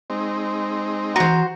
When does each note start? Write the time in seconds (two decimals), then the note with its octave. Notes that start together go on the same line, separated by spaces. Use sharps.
0.10 G#3 C4 D#4
1.16 E3 F#4 C5 A#5